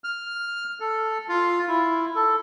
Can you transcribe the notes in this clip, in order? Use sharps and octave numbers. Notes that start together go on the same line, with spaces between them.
F6
A4
F4
E4
A4